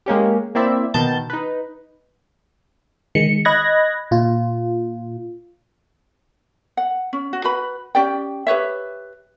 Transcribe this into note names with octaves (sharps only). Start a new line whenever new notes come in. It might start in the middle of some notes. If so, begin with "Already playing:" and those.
G#3 A#3 C#4 G4
A#3 C4 E4 C5 D5 E5
B2 D#3 A5 G6 A6
D#4 B4
D#3 G#3 C#7
D#5 B5 F#6 G#6 A#6
A#2 F4
F#5
C#4
F#4
F#4 B4 B5
C#4 G4 D5 G5
G4 B4 C#5 E5